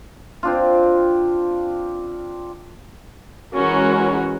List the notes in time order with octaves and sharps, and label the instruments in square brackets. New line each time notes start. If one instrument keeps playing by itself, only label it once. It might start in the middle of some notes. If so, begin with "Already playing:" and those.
[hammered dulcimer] C4 D4 F4
[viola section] E3 G#3 C#4 F#4 A#4